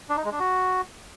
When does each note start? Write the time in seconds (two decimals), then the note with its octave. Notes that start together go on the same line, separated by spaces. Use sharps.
0.09 D4
0.17 D#4
0.24 G#3
0.32 D4
0.39 F#4